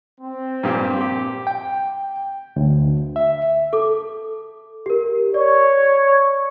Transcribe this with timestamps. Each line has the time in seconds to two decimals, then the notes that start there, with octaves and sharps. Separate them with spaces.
0.21 C4
0.63 G2 A#2 G4
1.01 G4
1.47 G5
2.56 D2
3.16 E5
3.73 A4 D6
4.86 G4 A#4
5.34 C#5 D5